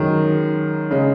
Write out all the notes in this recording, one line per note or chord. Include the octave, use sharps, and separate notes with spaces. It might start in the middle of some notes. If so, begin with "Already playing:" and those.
Already playing: F#2 D#3 G#3
C#3 G#3